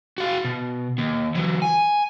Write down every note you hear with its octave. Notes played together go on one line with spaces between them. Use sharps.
F#4 F5
B2
D#2
E3 F#3
G#5